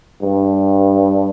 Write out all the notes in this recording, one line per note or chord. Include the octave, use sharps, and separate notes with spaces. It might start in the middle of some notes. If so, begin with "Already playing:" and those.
G2